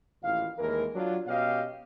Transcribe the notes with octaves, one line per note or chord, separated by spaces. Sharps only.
A1 A#2 D#3 E4 F5
D#2 A2 E3 G#3 A#4
F#3 D4 F4
B2 C#4 G4 D#5 F5